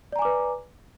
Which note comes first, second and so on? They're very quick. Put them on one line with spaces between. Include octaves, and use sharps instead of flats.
D5 A#5 G#5 D6 B4